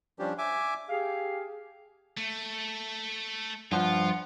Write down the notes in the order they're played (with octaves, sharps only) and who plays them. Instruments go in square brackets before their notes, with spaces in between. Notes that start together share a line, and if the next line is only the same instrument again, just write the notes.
[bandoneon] F3 G3 C#4 D4 G4
E5 G#5 D6
[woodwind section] G4 G#4 F5
[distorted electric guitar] A3
[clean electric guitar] G2 F3 [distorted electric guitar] F4 [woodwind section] F#5